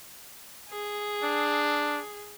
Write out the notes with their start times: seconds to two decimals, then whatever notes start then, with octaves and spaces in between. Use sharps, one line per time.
0.71 G#4
1.23 D4